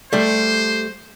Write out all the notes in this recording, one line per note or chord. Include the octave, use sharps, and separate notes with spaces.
G3 A3 C5